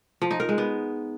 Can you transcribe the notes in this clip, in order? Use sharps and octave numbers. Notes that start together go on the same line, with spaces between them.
F3
D#4
A#4
G#3
B3